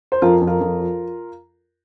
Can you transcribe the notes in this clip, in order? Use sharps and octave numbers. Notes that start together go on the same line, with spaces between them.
C5
F2 F4 A#4
F2
F4 A#4
F2
F3